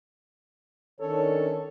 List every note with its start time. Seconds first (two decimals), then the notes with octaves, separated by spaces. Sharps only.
1.00 D#3 C#4 D4 A4 C#5